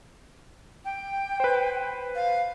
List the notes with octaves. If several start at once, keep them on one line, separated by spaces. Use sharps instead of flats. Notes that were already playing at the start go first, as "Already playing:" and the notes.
G5
B4 C5
F5